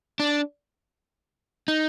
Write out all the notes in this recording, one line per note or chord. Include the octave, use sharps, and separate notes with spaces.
D4
D#4